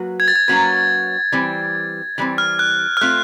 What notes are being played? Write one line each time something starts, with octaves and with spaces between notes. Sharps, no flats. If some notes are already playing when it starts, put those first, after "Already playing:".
Already playing: F#3 A#3 F#4 B4
G#6
A6
G#6
F#3 A#3 C#4 F#4 B4 G#6
E3 G3 C4
E3 G3 C4
F6
F#6
F6
A3 C4 F4 F#6